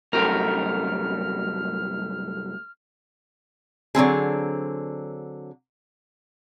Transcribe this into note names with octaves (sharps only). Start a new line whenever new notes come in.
C2 F#2 A3 G4 A#4 F6
D3 F#3 C4 G#4